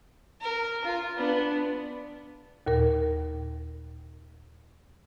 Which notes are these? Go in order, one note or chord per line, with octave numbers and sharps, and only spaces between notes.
A#4
F4
B3 D4
D#2 A#2 A#4